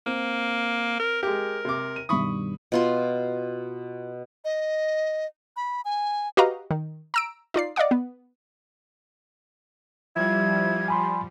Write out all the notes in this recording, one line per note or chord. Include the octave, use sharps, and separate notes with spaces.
A#3 C4
A#4
G#3 G4 A#4
C3 D6
D#7
G2 B2 D#3 B5 C#6 D#6
B2 F4 C6
D#5
B5
G#5
F#4 G4 B4 D#5 F5 A#5
D#3
A#5 E6 D7
D#4 F4 D5 C7
D5 D#5 F5 F#5 D6
B3
F3 G3 E4 G#6
G#5 B5 C6